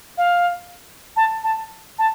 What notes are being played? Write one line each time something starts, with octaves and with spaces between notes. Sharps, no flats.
F5
A5
A5
A5